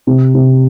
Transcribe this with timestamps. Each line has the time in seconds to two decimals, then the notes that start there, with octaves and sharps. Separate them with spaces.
0.07 C3
0.34 C3